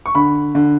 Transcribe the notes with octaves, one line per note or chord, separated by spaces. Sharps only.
C#6
D3 B5
D3